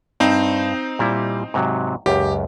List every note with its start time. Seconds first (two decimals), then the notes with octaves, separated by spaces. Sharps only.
0.20 G2 C4 D#4 C5
0.99 A#2 G3 E4
1.54 G#2 C3 F#3
2.06 C#2 F#2 G4